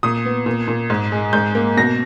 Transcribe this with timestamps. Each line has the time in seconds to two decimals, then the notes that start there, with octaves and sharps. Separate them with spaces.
0.03 A#2 D#6
0.25 B3
0.46 A#2
0.68 A#2
0.90 G#2
1.12 G#3
1.33 G#2 G6
1.55 A#3
1.77 B2 A#6